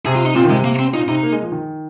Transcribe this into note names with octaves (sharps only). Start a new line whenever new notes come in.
C3 G#4
F4
D#4
A#2 C4
D#3
C3 G#3
A#3
C4
A#2 D#4
C3 D#4
A#3
G#3
F3
D#3